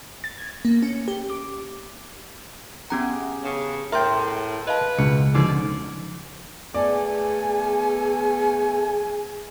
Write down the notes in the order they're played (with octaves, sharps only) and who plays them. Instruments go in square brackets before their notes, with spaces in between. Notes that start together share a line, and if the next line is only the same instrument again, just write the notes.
[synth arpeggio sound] A6
G#6
A#3
C#4
G4
D6
[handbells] B3 C#4 A#5 [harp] G4 G#4 F#5
[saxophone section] G2 C#3
[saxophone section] A2 [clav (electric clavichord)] A#4 G5 [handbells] E5 C6
[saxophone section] B4 [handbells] D#5 F5 A5
[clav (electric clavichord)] C#2 [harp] B2 [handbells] C#7
[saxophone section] B2 D5 [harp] D3 F3 F4 [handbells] D#4
[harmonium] A3 B3 A4 [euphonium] G#4 [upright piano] D5 [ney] G#5